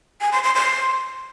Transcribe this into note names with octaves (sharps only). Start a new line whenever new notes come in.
G#5
C6
C6
C6